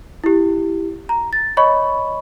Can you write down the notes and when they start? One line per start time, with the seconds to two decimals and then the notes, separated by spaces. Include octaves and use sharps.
0.24 E4 G4
1.09 A#5
1.33 A6
1.57 C#5 D#5 B5 C#6